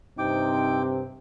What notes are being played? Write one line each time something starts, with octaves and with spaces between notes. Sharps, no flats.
G2 C3 C4 D#4 G5 D6